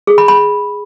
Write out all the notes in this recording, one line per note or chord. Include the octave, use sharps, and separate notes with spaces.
G#4
B5
B5